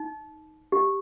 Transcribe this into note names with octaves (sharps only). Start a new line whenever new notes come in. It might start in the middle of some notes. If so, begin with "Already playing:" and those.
Already playing: D#4
G4